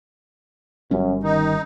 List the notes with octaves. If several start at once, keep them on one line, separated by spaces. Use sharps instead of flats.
G1 F#2 G3 C#4
D#3 D#4